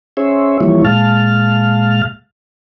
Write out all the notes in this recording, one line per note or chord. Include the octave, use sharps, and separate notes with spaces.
C#4 G#4 C5 C#5 E5
E3 F3 G3 A#3 E4 C#5
A#2 G#3 F5 A5 F6